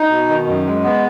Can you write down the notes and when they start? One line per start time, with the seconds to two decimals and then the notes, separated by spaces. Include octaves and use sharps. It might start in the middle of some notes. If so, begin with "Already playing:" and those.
Already playing: D#4
0.10 B2
0.29 D#3
0.47 F#2
0.66 G#3
0.84 B3